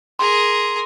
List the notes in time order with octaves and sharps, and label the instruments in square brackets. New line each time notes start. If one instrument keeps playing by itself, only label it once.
[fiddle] G#4 A#4 [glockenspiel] C6